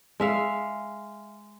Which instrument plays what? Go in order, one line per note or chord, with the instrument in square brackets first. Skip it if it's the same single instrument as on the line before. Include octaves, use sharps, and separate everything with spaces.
[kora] G#3 E5 F5